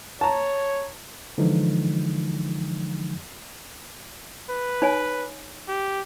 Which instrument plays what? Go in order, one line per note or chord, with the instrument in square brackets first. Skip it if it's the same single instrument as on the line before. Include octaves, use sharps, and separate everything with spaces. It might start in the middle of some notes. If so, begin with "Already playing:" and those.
[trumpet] C#5 [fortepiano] A5 A#5
[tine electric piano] D3 E3 F3 G#3 D#4
[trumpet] B4
[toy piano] D#4 C#5 G#5
[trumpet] G4